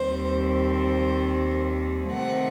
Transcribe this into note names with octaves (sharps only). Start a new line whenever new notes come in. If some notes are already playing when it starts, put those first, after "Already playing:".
Already playing: D#2 D#3 G3 C4 C5
C5
C3 D#3 A3 C4 F#5